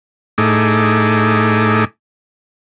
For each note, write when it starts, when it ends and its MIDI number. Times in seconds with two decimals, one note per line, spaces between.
0.38 1.85 45
0.38 1.85 57
0.38 1.85 63
0.38 1.85 68
0.38 1.85 86